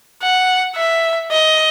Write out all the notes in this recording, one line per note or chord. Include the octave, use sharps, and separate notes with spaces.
F#5
E5
D#5